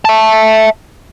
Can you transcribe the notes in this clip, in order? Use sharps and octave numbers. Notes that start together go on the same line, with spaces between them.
E5 A5